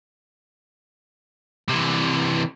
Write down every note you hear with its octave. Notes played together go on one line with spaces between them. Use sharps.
C3 E3